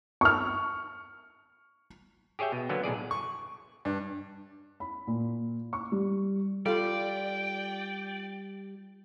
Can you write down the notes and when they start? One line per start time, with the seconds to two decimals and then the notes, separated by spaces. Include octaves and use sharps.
0.21 C#6 F6
2.39 G4 G#4 C#5 E5 G5
2.52 B2
2.69 D3 F#3 A#3 B3
2.84 B1 A2 G#4 D5
3.11 C#6
3.85 G2
4.80 B5
5.07 A#2
5.73 C#6
5.92 G3
6.66 G3 F4 A4 D5 F5 G5